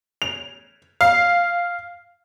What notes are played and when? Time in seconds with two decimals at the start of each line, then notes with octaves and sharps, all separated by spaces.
0.22 F7
1.01 F5